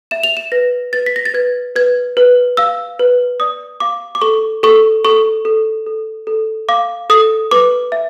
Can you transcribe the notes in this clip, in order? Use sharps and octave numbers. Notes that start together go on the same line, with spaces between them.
E5 E7
F7
E7
B4 A#6
B4 A6
B6
A#6
A6
B4 G#6
B4 G#6
B4
F5 E6
B4
D5 D#6
F5 D6
D6
A4 C#6
A4 C#6
A4 C#6
A4
A4
A4
F5 D6
A4 D#6
B4 D6
E5